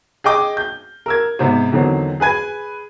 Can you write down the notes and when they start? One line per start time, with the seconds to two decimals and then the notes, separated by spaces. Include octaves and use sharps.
0.24 G#4 D#5 G5 D6 D#6
0.57 G6
1.06 A#4 E6 G#6
1.39 G#2 C3 B3 C4
1.72 E2 D3 D#3 F#3 C4
2.20 G#4 B4 G#5 G#6